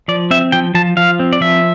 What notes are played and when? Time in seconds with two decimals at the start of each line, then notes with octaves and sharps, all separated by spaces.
0.08 F3 D5
0.31 C4 E5
0.52 F3 G5
0.75 F3 A5
0.97 F3 F5
1.19 C4
1.33 D5
1.41 F3 E5